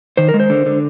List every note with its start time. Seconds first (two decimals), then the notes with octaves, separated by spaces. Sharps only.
0.17 D#3 C5
0.29 A#4
0.34 G#3
0.40 C5
0.50 D3
0.66 D3